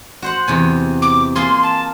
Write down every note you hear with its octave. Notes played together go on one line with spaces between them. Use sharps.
F#4 C5 F#5
E2 C3 G#5
D6
A#3 F4 G#4 C6
A5